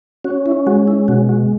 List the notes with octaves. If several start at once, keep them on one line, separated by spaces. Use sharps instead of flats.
C#4 F#4
E4
G#3 F#4
E4
B2 F#4
F#4